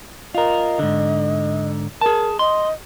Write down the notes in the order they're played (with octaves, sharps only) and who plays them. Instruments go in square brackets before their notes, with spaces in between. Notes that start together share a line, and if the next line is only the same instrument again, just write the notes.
[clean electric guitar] F4 A#4 [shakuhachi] D#5
[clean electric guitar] G#2 D3
[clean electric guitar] G#4 A5 [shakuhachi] A#4
[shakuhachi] D#5 [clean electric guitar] C6